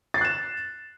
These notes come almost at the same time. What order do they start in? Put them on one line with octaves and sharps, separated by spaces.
A6 C7 F#6 E7